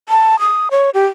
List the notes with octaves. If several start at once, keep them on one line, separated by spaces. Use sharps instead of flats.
A5
D#6
C#5
G4